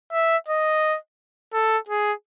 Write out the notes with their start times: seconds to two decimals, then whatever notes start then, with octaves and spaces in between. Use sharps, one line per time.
0.12 E5
0.48 D#5
1.53 A4
1.89 G#4